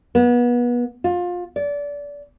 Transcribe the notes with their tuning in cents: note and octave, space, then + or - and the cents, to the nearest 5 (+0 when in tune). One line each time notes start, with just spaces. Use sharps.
B3 -30
F4 +25
D5 -25